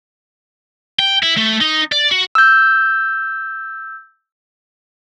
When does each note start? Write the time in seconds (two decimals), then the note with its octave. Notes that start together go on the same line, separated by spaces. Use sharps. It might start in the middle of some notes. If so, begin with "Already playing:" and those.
0.99 G5
1.23 E4
1.37 A3
1.61 D#4
1.92 D5
2.11 F#4
2.35 E6 G6